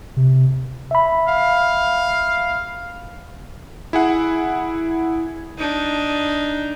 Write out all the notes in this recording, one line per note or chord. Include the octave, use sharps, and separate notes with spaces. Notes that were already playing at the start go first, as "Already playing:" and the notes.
C3
E5 B5
F5
E4 G#4 F#5
D4 D#4